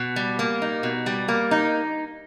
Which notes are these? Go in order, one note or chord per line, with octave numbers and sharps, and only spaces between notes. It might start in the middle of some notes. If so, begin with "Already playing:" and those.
Already playing: B2
G3
A#3
D#4
B2
G3
A#3
D#4